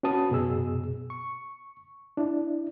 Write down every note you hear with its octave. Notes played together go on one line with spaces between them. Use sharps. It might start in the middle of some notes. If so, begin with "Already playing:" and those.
C#4 F#4 B4 A5 D#6
F#2 B2 G#4 E6
C#6
D4 E4